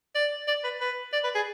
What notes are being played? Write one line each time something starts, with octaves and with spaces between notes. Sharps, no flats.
D5
D5
B4
B4
D5
B4
G#4